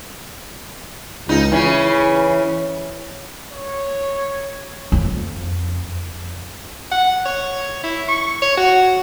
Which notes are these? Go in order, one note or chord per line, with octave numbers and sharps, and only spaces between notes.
C#2 D#4
C#3 E3 C#4
C#5
F2
F#5
C#5
E4
C#6
C#5
F#4